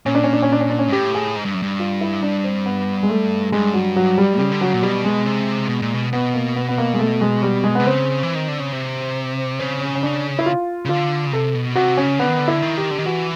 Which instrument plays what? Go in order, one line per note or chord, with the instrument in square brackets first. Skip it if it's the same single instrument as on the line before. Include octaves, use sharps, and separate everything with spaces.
[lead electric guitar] A#2 [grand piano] C#4
[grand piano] D4
C#4
D4
C#4
D4
C#4
D4
C#4
[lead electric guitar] G#2
[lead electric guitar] A2 [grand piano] G4
[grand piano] G#4
[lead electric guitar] G#2
G2
F#2
G2
[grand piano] F4
E4
D4
C4
B3
G#3
A3
[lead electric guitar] G2 [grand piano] G#3
[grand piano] F#3
F#3
G3
[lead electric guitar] C#3 [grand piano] G3
[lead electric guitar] D3
[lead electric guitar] C#3 [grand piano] F#3
[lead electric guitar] A#2
[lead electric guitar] B2 [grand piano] G3
[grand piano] G#3
[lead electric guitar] C3
B2
A#2
B2
[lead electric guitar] B2 [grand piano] B3
[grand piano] A#3
B3
B3
A#3
G#3
A3
G#3
G3
G#3
[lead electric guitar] C3 [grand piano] B3
[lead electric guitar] C#3 [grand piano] C4
[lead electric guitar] E3
D#3
D3
C#3
C3
[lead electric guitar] C#3 [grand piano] C4
[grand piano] C#4
C#4
D4
E4
F4
[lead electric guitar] C#3
[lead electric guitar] D3 [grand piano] F4
[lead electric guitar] C#3
[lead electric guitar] C3 [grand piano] A4
[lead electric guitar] B2
[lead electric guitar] C3 [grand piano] F#4
[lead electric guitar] C#3 [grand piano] C#4
[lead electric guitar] D3 [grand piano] B3
[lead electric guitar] D#3
D3
[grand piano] E4
[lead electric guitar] D#3
[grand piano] G4
[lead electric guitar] D3
D#3
[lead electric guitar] E3 [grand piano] F#4